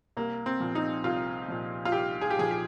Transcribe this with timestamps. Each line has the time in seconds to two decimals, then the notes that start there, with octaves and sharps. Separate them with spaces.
0.17 C2 A#3
0.46 C4
0.60 A#2 F3
0.75 D#4
1.04 C2 F4
1.48 A#2 F3
1.85 F4
1.92 C2 G4
2.21 G#4
2.30 G4
2.36 A#2 F3 G#4
2.51 G4